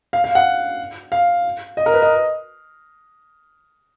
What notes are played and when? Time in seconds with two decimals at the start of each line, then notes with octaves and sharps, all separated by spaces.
0.13 F5
0.24 F5
0.35 F#5
1.12 F5
1.77 D#5
1.86 A#4
1.94 B4
2.02 D#5